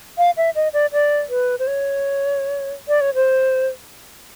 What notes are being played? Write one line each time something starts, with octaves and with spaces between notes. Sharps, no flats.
F5
E5
D#5
D5
D5
B4
C5
C#5
D5
C#5
C5